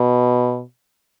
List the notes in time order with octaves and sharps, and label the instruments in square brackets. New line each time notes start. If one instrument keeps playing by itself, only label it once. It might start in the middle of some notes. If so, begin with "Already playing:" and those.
Already playing: [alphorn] B2